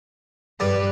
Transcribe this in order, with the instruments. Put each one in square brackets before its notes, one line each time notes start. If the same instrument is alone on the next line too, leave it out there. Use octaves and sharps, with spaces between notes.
[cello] G2 B4 [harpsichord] G3